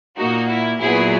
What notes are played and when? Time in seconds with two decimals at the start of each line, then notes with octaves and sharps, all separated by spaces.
0.17 A#2 A#3 D#4 F#4
0.48 E4
0.80 A#2 F#3 B3 E4 G#4